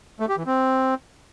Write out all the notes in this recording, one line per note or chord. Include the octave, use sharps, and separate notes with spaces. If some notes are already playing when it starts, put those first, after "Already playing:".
A3
G4
E3
C4